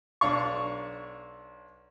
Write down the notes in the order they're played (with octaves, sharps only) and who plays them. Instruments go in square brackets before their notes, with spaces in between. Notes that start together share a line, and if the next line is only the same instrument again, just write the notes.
[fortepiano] B1 D4 F5 C#6